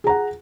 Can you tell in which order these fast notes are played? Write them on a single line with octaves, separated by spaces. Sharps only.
G#4 A#5 F#5